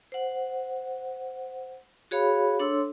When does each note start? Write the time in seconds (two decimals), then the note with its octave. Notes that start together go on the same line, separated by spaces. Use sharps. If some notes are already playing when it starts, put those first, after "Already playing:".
0.12 C5 F#5
2.11 F#4 G#4 C#5 F5 B5
2.60 D4 A4 C#5 C6 E6